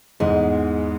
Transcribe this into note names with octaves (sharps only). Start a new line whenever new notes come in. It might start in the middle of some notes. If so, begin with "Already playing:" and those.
E2 G#2 G#3